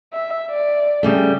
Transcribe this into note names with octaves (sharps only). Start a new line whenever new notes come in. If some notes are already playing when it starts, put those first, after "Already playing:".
E5
D5
C#3 G3 A3 G4